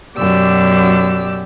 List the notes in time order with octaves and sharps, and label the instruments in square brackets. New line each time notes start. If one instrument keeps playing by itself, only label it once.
[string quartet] F#2 B2 G4 D5 E6